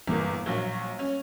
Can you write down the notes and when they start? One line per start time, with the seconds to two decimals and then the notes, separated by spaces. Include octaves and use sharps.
0.08 G1 E2 G3 A#3 A#4
0.46 A#1 F#3
0.99 C#4